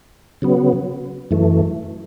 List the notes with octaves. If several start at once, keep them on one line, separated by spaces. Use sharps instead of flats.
C#3 F#3 B3
F#2 E3 A3